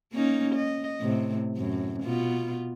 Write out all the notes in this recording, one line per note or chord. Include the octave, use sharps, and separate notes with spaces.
A#3 C#4 D#4
D#5
A2 C3
F#2 A2
B2 B3 F4